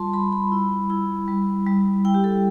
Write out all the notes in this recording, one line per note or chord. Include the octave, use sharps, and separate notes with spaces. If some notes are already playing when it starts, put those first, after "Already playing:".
Already playing: G3 F4 A5 C6
G3 B5
B5
E4
E4
G3
G3
E4 G5
G4
A4